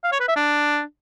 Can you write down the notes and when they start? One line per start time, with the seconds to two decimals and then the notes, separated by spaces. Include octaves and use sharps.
0.04 F5
0.12 C#5
0.20 B4
0.28 E5
0.36 D4